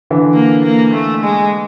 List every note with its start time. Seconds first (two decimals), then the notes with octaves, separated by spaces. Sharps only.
0.10 D3 E3
0.34 A#3
0.64 A#3
0.93 A3
1.24 G#3